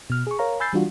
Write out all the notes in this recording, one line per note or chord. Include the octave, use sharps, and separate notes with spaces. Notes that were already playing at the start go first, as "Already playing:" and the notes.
B2 F6
G#4 C#6
A#4 C#5 F5 A#5
G#5 B5 E6 G6 A6 C7
E3 G3 D4 F4 F#4